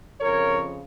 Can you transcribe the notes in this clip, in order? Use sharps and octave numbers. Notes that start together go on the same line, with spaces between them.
F2 C#3 F3 A#4 C#5